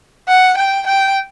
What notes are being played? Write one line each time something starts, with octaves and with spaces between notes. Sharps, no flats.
F#5
G5
G5